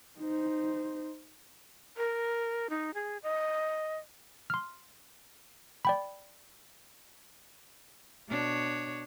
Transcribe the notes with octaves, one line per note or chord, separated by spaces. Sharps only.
D#4 C5
A#4
D#4
G#4
D#5
C6 F6
D5 G5 B5
B2 D4 C#5